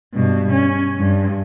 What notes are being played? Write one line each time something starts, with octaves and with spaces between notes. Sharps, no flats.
G2 B2
C#4
G2